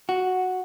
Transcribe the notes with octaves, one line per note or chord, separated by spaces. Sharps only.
F#4